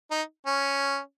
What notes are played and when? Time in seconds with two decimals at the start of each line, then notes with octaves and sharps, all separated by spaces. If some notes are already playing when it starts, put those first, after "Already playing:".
0.11 D#4
0.46 C#4